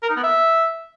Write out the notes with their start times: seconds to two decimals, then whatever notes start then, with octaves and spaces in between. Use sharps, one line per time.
0.03 A#4
0.09 D#4
0.16 B3
0.23 E5